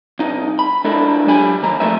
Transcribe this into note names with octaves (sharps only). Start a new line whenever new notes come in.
C2 D#4
B5
G#3 D4 E4 A4 A#4
F#3 G4 G#5 B5
D#3 A#3 A#5
F3 A3 D#4 A#4 D#5 E5